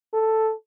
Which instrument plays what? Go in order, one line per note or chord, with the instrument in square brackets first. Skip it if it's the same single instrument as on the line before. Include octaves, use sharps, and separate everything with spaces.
[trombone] A4